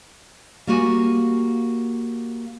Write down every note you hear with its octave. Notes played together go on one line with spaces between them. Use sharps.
G3 A#3 F#4 G#5